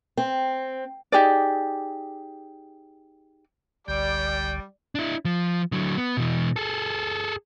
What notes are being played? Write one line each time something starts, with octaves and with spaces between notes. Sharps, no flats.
C4
D#4 G4 G#4 D5
G1 C#2 D3 G3 D5 G5
D4 E4
F3
D3 F#3
B3
B2 E3
G#4 A4